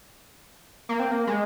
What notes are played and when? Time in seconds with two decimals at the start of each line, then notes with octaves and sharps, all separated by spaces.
0.89 A#3
1.00 C4
1.11 A#3
1.27 G#3